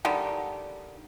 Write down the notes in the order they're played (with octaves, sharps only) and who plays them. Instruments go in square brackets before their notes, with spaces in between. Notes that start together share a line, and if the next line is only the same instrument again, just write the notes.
[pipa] D3 D#3 G3